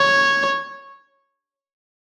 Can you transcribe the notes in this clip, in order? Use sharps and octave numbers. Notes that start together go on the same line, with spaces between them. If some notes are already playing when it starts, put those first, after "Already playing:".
Already playing: C#5